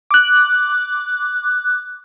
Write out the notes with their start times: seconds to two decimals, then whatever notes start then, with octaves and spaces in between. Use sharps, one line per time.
0.11 D6 F#6